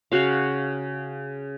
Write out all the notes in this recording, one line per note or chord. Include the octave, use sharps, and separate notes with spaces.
C#3 F#4 F5